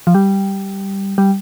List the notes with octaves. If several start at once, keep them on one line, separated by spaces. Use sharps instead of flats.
F3
G3
G3